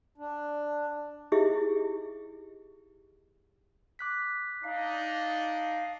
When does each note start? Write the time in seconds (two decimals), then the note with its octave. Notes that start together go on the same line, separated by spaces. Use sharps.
0.18 D4
1.32 D#4 E4 G4 G#4 D#5 E5
3.99 D6 F#6 B6
4.63 D4 D#4 F5